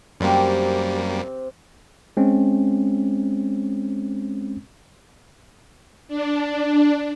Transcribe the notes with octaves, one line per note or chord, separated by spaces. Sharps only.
F#2 C3 G3 A#3 C4
G#3 C4 C#4
D4